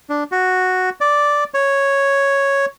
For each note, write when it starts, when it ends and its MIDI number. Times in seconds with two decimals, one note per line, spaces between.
0.10 0.24 62
0.32 0.90 66
1.01 1.44 74
1.54 2.65 73